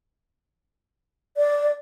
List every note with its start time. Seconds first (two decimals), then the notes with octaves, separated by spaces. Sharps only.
1.37 D5